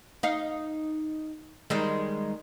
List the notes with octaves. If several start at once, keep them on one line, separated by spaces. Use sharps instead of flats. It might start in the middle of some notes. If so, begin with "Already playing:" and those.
D#4 F5
D#3 G3 G#3